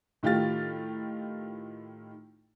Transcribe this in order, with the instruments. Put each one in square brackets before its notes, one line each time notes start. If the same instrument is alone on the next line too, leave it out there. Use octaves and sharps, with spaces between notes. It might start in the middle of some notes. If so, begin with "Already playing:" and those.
[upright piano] A2 D#3 F4 G4 F5 A6